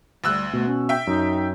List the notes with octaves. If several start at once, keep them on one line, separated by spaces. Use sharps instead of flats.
D2 G3 E6 F#6
B2 A3
C#4
E5 G5
F#2 D#4